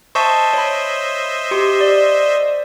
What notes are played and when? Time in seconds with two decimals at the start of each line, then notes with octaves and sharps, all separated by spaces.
0.15 C5 D#5 E5 A5 C#6
0.53 C#5 B5
1.51 G4 C6
1.81 D5